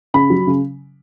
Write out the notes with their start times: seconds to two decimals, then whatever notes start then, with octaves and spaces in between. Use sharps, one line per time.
0.14 C#3 B5
0.30 F#3
0.47 C#3